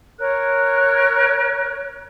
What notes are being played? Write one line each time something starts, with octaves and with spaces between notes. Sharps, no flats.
A#4 C#5 F#6